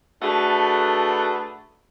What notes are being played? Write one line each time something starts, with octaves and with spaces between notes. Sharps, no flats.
A3 D4 F#4 G#4 A4 B4